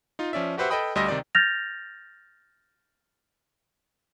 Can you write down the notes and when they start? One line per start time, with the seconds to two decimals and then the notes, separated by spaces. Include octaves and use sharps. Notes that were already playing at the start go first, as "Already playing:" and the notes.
0.19 D#4 F4
0.33 F3 C#4 D5 E5
0.58 F#4 G4 B4 C5 E5 F#5
0.70 A4 B4 D#5 G5 B5 D#6
0.95 D2 G3 D#5 C6 E6 A#6
1.08 C3 D#3 D#4 D5
1.35 F6 G6 A6 A#6 F7